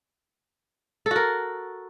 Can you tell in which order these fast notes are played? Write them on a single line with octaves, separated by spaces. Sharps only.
A4 F#4 A#4